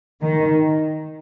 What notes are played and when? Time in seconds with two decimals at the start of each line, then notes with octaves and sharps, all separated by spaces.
0.21 D#3